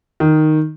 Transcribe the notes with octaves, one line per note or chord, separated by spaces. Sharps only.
D#3